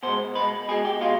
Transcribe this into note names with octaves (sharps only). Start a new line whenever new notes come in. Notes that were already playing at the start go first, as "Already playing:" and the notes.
B2 G#3 C5
B2 G#3 B4
B2 G#3 G#4
G4
B2 G#3 F4